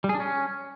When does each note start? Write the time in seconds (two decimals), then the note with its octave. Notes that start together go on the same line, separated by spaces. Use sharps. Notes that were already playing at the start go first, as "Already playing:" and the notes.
0.04 G3
0.09 G#4
0.15 D4
0.20 C#4